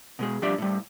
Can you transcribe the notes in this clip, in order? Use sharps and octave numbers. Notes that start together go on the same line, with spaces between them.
B2 G#3 G#4
F3 G3 D4 G4 D5 E5
A2 G3